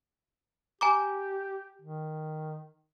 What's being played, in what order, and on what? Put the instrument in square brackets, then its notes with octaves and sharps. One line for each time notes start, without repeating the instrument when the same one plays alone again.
[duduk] G4 [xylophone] G#5 A#5 D6
[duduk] D#3